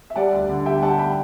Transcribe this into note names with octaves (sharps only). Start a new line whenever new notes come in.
E5
G3 D5 F#5
D2
D3
G3 E5 G5
G3 F#5 A5
G5 B5